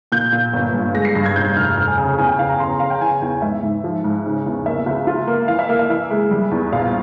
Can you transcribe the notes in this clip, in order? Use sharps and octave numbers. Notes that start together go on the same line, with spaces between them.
A#2 G6
A#2
G1
G2
G#3 A#6
C7
G2 A#6
G#6
F1 G6
F1 F6
F2 F6
G#5
C#3 G#5
E2 G#5
G5
E2 F5
A#5
C#3 C6
A#5
C#3 F5
G5
E3 G#5
E2 G5
G#2 E5
G#2
F3
G#2
C#3
E2
A#3 E5
C#2
F4
A#3
E3 F5
E5
A#3 F5
E5
E3 E5
G#3
G3
E2
A#1 F5